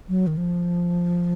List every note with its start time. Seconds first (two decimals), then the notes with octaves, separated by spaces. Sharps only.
0.09 F#3
0.27 D#3
0.37 F3